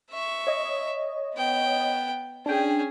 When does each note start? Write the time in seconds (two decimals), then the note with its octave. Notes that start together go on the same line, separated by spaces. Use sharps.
0.11 E5 C#6
0.47 C#5 D#5
1.35 B3 G5
2.46 C#4 D4 G#4 G5